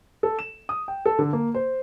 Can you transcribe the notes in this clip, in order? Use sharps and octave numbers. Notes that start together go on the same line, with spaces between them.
A4
E7
D#6
G5
A4
D3
A#3
C5